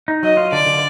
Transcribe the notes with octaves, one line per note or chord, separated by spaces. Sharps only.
D#4
F#3 D#5
F4
D3 D5
D3